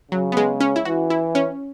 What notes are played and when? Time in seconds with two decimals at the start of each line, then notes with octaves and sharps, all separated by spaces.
0.12 C#3 F#3
0.32 B3
0.37 G#3
0.60 C#4
0.76 E4
0.85 E3 F#4
1.10 E4
1.35 C#4